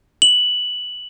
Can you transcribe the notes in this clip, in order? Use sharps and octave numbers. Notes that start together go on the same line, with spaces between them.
F#7